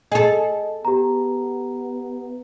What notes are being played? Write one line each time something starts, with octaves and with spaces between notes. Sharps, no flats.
G#4 A4 D#5
B3 G4 A#5